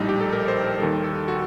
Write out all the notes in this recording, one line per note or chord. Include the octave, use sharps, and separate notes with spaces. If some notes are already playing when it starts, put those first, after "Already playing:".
Already playing: A#1 A2 G3 D#4
G4
A4
A#4
C5
A#4
D#2 D#3 G3 A4
A4
F#4